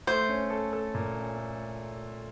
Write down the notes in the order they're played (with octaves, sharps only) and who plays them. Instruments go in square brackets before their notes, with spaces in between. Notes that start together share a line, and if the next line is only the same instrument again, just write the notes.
[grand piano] A3 [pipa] C5
[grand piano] C#4
A4
A4
A#2
C#4
A3